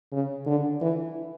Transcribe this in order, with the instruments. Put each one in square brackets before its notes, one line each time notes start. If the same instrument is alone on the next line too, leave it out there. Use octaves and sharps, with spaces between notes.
[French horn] C#3
D3
E3